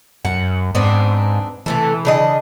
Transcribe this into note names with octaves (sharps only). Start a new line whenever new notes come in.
F#2 F#5
G#2 B3 C4 D4
C3 E3 A3 A4
C#3 D4 D#5